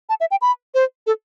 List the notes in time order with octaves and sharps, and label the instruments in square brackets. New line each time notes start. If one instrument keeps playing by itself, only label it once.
[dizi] A5
E5
G5
B5
C5
A4